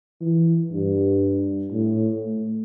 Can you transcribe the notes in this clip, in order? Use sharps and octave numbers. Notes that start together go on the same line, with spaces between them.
E3
G2
A2
A3